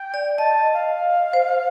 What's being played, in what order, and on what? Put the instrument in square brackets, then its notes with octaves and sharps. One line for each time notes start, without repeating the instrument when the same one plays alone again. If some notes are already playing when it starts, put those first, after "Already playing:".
Already playing: [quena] G5
[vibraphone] D5
[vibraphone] D#5 [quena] A5
[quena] F5
[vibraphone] C5